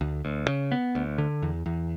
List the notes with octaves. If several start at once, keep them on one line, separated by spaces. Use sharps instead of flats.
D2
D2
C#3
B3
D2
D3
E2
E2